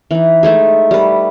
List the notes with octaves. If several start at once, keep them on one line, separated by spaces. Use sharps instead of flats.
E3 D#4
G#3 A3 D#4 G#4
G3 B4